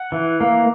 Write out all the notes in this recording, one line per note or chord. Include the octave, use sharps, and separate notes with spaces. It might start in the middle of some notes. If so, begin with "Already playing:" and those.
Already playing: F#5
E3
A#3